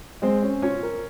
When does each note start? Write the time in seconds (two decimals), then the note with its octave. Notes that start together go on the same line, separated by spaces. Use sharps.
0.22 G#3 C4 C5
0.42 C#4
0.62 C#4 F4 C#5
0.83 A#4